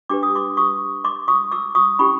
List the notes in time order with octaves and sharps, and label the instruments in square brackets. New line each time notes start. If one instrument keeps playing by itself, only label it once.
[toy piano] D4 G4 B4 D6
D#6
C6 D6
C#6 D#6
C6 D6
C#6 D#6
D6 E6
C#6 D#6
C#4 E4 G4 B5 C#6